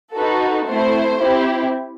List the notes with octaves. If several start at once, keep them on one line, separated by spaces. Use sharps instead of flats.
D#4 F#4 A4 B4
A3 C4 E4 C5
C4 E4 G4